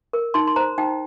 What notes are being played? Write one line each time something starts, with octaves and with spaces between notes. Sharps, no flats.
A#4
D#4 C6
C6
C5 A#5
D#4 G5